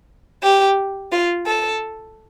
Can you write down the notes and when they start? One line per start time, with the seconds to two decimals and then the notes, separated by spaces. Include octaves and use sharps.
0.43 G4
1.12 F4
1.46 A4